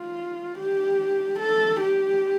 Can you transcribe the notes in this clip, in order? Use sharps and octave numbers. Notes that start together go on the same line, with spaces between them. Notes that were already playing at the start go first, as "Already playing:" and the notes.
Already playing: F4
G4
A4
G4